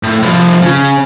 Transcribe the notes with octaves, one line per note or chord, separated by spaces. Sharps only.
A2
C2 F3
C#3